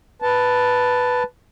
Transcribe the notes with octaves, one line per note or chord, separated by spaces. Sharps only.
B4 A5